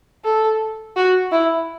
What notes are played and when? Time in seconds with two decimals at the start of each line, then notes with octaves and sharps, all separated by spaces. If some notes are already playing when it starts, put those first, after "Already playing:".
0.25 A4
0.96 F#4
1.32 E4